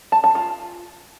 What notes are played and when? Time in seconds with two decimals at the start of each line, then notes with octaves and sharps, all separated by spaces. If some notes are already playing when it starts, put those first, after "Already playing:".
0.12 A5
0.24 A5
0.35 F4